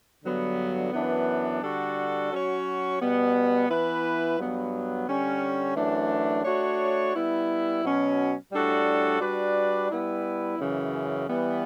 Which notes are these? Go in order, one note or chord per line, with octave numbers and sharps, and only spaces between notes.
G2 D3 F#3 B3
F#2 E3 B3 D4
D3 G3 D4 F#4 A4
F#3 C#4 F#4 C#5
B2 G3 B3
E3 B3 E4 B4
G2 F#3 B3
D3 G3 C#4
F#2 E3 A3 D4
A3 D4 F#4 C#5
G3 B3 E4
B2 F#3 C#4
A2 G3 D4 F#4 A4
G3 D4 F#4 B4 D5
G3 B3 E4
F#2 C#3 E3
E3 G3 B3